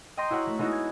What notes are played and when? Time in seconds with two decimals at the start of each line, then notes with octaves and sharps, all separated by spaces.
0.17 D#5 G5 A#5 C6 A#6
0.30 E4 F#4 C#5 F#5
0.47 A3
0.59 G#3 B3 D#4 E4 F#4
0.72 G#6